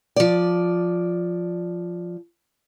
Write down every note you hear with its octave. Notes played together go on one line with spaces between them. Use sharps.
F3 D5